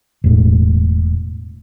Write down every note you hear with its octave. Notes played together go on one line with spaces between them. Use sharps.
E1 A2